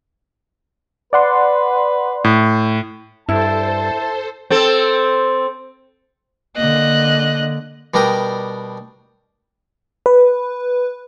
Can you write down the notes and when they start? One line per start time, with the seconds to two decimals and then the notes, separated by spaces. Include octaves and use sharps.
1.13 B4 D5 F#5 C6
2.24 A2
3.29 G2 E4 A4 C5 A5
4.50 C4 A4
6.56 D3 A#3 D#5 F#6
7.94 B2 G3 D4 A#4 G5 D#6
10.06 B4